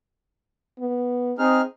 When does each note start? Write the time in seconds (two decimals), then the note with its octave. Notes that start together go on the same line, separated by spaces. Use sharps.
0.80 B3
1.39 C4 D#4 G#4 F6